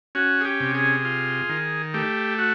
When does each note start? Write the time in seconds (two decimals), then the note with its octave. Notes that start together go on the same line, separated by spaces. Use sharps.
0.15 C#4 F#4
0.41 G#4
0.45 G4
0.60 C3
0.75 G#4
1.04 F4
1.49 D#3
1.94 A3 G4
2.38 F#4